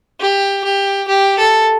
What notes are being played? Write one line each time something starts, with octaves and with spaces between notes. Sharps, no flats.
G4
G4
G4
A4